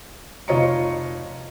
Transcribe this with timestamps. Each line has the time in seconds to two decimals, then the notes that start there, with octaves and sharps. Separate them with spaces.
0.48 F1 F4 C#5 D#5 A#5 C#7